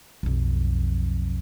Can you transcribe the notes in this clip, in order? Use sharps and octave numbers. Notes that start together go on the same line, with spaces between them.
B1 F2